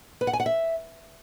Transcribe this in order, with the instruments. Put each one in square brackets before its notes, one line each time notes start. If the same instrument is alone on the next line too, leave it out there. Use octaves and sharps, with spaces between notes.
[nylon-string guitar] B4
F#5
G#5
F#5
E5